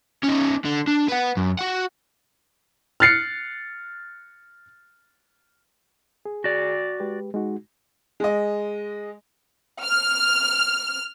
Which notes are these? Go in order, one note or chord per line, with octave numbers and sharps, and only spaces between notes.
C#4 D#4
D3
D4
B4 F#5
F#2
F#4 F#5
F6 F#6 A6 C7 C#7
G#4
F#4 D5
G#3 G4 B4
G#3 D#4 F#4
G#3 D#5
F6